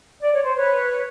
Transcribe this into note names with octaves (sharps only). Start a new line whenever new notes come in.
D5
C#5
C5
B4 C#5